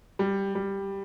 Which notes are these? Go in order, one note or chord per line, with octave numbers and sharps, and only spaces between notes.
G3
G3